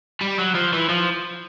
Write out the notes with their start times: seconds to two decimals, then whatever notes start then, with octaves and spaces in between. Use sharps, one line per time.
0.21 G3
0.38 F#3
0.55 F3
0.73 E3
0.89 F3